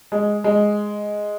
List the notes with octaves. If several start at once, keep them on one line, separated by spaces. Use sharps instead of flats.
G#3
G#3